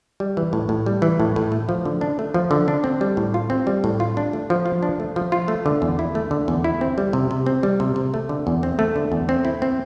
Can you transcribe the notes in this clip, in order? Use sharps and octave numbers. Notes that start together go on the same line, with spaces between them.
G3
E3
A2
A2
G3
E3
A2
A2
A3
F3
D3
D4
A3
F3
D3
D4
C4
G3
A2
F4
C4
G3
A2
F4
D4
A3
F3
F4
D4
A3
F3
F4
A3
D3
E2
E4
A3
D3
E2
E4
C4
G3
C3
C3
C4
G3
C3
C3
A3
D3
E2
C4
A3
D3
E2
C4
E4
C4